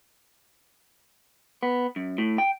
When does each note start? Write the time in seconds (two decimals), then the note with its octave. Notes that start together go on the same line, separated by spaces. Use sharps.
1.63 B3
1.96 F#2
2.18 A2
2.38 G5